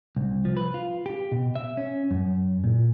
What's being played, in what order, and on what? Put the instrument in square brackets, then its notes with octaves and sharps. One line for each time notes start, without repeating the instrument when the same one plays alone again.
[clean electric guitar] C2
F3
B4
F4
G4
B2
E5
C#4
F#2
A#2